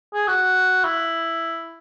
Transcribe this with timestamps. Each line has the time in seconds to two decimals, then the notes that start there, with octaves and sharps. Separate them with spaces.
0.13 G#4
0.28 F#4
0.84 E4